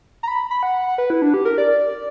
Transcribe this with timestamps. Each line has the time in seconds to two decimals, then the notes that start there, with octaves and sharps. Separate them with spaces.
0.23 A#5
0.28 B5
0.51 B5
0.63 F#5
0.98 B4
1.10 E4
1.22 D4
1.34 G4
1.45 A#4
1.58 D5